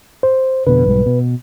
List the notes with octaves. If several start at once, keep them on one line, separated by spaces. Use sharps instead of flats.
C5
F2 B2 D3 B4
B1 G#2 G3
B2